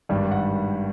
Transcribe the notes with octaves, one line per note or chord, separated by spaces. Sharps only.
G#1 G2 D#3 G3
F#5